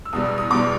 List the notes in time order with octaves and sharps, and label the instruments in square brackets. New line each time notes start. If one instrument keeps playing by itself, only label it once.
[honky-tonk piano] E6
E2 B2 G3 D#6
E6
D#6
E2 B2 G3 D6